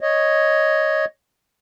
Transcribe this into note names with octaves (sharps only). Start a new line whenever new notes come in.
C#5 D#5